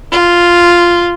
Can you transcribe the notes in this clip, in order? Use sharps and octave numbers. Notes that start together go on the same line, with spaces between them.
F4